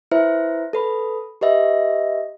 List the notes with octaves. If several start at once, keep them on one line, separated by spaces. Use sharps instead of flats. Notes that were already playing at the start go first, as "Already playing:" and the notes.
E4 B4 C5 E5
A4 B4 B5
G4 B4 D#5 E5